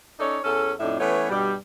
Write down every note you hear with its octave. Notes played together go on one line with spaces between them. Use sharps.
C#4 D#4 A4 C#5 D5
E2 C#4 A4
F2 A2 D4 D#4 E5
E3 A3 B3 C#4 C#5
G2 B2 G3